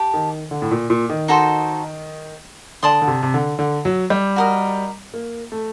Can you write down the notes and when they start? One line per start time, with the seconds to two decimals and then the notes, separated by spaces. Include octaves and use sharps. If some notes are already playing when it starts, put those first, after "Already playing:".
Already playing: G4 A5 D6
0.14 D#3
0.51 D3
0.62 A2
0.71 A#2
0.90 A#2
1.10 D#3
1.28 D#4 F#4 A4 C5
2.83 D3 D5 A5 C6 D#6
3.02 D3
3.07 C3
3.23 C3
3.34 D3
3.59 D3
3.85 F#3
4.10 G3
4.36 F#4 A#4 D#5
5.14 A#3
5.52 A3